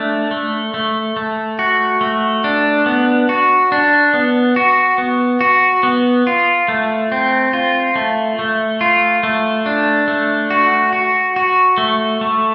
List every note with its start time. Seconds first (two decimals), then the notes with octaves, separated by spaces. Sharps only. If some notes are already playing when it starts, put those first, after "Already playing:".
Already playing: A3 D4
0.31 A3
0.74 A3
1.17 A3
1.59 F#4
2.01 A3
2.44 D4
2.86 B3
3.29 F#4
3.72 D4
4.14 B3
4.56 F#4
4.98 B3
5.41 F#4
5.83 B3
6.27 F4
6.68 A3
7.12 C4
7.53 F4
7.96 A3
8.39 A3
8.81 F4
9.23 A3
9.66 D4
10.08 A3
10.50 F#4
10.93 F#4
11.36 F#4
11.78 A3
12.21 A3